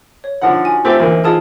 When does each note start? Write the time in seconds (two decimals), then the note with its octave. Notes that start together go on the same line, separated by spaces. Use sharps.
0.24 C#5
0.41 D3 F3 D#4 F4 F#5
0.65 F#4 G#5
0.85 A3 C4 F4 G4 C5
0.99 D2 E3 A#3 D#4
1.24 G#3 F4 A4 A5 D#6